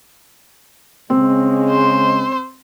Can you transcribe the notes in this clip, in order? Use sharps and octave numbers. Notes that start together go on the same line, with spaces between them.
C#3 G#3 C4
C5